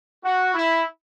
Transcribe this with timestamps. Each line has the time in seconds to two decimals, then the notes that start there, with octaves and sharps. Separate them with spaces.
0.23 F#4
0.54 E4